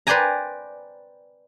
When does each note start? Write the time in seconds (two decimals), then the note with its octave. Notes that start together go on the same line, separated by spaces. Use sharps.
0.07 B4 C5 D5 G5 G#5 A#5